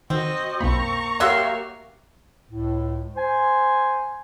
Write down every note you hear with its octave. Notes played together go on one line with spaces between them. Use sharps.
D#3 C4 F#4 D#5
B1 F2 A#3 A#5 B5 C#6
F#3 G4 A#4 E5 F5 C6
C#2 A2
C5 G#5